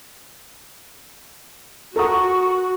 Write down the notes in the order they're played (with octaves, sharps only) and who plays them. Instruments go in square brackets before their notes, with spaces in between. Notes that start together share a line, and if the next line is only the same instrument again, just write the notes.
[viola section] F#4 [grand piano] A4 F#5 [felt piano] A#4 A#5 D#6 [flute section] C#6